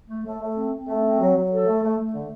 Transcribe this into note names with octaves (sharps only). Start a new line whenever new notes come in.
A3
A3
A3
C4
C4
A3
C4
F#3
F#3
A4
A3
A3
A3
D3